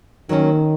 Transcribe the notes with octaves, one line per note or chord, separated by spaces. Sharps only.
D#3 F#3 A#3 C#4